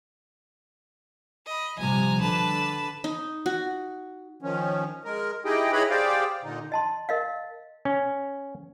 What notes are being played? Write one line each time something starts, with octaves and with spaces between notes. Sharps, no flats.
D#5 B5
C3 F3 G3 G#5 A#5
D3 B4 A5
D#4
F#4
D#3 F3 C#4
G#3 A#4
D#4 E4 G4 G#4 D#5 G5
E4 G#4 B4 C#5 D#5 B5
G4 G#4 C5 D5 F5 G5
A#2 D3 D#4
D#5 A5 C6
A#4 D#5 F5
C#4